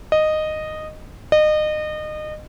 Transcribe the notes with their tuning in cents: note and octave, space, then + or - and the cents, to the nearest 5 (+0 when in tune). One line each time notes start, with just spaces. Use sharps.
D#5 -10
D#5 -30